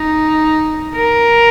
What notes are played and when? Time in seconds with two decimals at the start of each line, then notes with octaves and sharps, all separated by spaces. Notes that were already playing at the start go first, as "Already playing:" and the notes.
Already playing: D#4
0.95 A#4